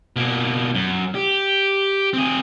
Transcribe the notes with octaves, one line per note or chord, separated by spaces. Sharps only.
B2 A#3
F#2
G4
C4 G#4